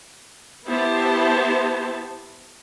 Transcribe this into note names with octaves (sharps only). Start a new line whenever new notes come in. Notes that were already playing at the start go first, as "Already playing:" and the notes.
B3 E4 G4 C5 A5